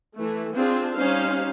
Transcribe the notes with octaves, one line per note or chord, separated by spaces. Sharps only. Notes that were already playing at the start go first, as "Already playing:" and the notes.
E3 A3
C4 D4 F4 G#4
G3 C#4 D#4 C5 F5